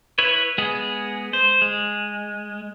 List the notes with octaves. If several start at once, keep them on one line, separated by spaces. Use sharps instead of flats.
E4 B4 C#5
G#3 B3 G#4
C5
G#3